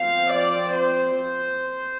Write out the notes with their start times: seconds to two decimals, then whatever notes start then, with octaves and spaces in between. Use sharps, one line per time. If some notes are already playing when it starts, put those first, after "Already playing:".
Already playing: F3 C4 F5
0.33 D5
0.76 C5